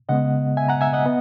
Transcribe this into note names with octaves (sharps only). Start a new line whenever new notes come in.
C#3 G#3 B3 D#5 F#5
E5 G#5
F#5 A#5
E5 G#5
D#5 F#5
B3